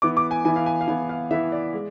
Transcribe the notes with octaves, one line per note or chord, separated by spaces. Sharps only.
E3 B3 E4 D6
D6
G#5
E3 B3 E4 G#5
F5
G#5
F5
E3 B3 E4 G#5
F5
E3 B3 E4 E5
D5
G#3